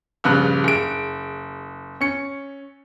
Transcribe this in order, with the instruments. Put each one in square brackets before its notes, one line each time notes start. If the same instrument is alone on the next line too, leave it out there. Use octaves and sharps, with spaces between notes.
[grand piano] A#1 G2 C#3 F#6
F#1 D7
C#4 C#7